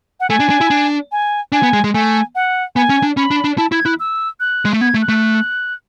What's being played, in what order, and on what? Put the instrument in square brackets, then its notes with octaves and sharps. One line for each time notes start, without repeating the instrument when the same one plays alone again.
[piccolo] F#5
[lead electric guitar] A3 [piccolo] G#5
[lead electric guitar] D4
D4
E4
D4
[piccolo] G#5
[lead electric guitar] D4 [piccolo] G#5
[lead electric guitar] B3
G#3
G#3
[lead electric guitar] A3 [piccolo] G#5
[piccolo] F#5
[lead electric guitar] B3 [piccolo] G#5
[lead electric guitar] C#4
D4
[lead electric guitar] C#4 [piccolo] B5
[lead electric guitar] D4
D4
[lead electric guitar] E4 [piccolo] A5
[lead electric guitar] E4 [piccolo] G#6
[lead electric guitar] E4 [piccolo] F#6
[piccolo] E6
F#6
[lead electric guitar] G#3
A3
[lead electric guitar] B3 [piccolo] G#6
[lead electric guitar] A3
[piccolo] F#6
[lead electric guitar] A3